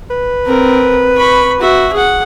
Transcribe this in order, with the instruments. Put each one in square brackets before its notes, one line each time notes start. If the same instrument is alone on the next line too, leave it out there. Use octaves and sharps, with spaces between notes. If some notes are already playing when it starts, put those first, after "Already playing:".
[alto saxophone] B4
[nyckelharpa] C4 A#4
B5 C#6
F#4 E5
G#4 F#5